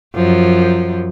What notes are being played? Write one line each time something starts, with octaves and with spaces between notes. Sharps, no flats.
F#2 F3